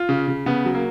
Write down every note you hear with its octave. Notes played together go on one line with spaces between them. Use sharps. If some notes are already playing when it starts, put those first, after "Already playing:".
Already playing: F4
C#3
C#3
C#3 B3
F#3
A#3